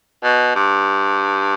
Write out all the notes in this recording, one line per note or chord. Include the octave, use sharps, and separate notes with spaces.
B2
G2